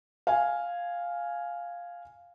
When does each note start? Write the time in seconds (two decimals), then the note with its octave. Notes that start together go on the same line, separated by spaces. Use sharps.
0.27 F5 G#5